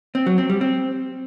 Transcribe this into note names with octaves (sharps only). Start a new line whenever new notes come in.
C4
F#3
C4
G3
C4